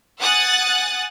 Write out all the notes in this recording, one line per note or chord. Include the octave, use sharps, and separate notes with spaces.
F#5 G#5 D#6 F#6 A6